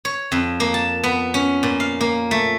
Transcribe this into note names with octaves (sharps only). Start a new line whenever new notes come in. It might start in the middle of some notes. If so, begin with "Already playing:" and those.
C#5
F2
A#3
A5
B3
C#4
A#2
F5
A#3
A3